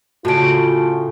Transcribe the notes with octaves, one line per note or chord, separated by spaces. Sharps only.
A2 C#3 F4 F#4 A5 D7